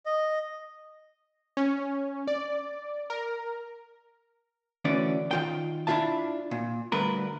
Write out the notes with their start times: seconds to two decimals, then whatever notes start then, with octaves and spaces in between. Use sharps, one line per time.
0.06 D#5
1.57 C#4
2.27 D5
3.10 A#4
4.85 D2 E3 C#4 D5
5.31 D#3 F4 G5
5.87 D4 E4 F4 E5 A5
6.51 A#2
6.92 D2 G2 A#4 B4